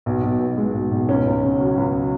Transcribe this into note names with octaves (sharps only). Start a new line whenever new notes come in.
B1
B1
B2
G#3
B1
B1
C#2 C#4
C#2
C#3
F#3
C#2